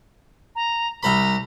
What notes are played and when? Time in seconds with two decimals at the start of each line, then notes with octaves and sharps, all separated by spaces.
0.55 A#5
1.03 C2 C5 A#5 B5